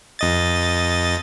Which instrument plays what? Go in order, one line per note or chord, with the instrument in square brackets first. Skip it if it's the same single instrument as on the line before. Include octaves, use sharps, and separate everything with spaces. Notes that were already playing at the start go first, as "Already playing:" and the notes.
[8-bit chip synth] F2 D#5 A6